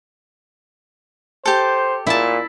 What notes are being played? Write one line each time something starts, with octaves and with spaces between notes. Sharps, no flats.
G4 A4 C5
A#2 E4 A5